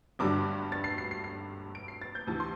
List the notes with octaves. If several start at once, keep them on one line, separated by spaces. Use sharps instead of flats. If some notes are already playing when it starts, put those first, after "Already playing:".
G1 G2 D3 F#3 D6
A6
C7
C7
C7
C7
D7
C7
A6
G6
D2 C3 E3 A5
C6